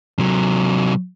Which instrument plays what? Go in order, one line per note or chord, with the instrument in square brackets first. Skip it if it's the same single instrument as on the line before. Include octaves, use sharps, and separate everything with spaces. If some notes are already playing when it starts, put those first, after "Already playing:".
[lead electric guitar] C3 F#3